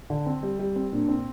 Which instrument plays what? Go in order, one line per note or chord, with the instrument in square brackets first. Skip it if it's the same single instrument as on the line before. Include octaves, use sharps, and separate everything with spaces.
[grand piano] D3
C4
G3
G3
C4
[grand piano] A#2 [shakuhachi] D4
[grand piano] C4